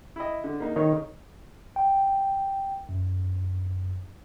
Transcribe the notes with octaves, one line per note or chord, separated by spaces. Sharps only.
E4 D#5
D3
A#3 D#4
D#3 D#4 C#5
G5
F#2